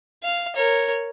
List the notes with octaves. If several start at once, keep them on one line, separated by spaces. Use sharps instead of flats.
F5
A#4 C#5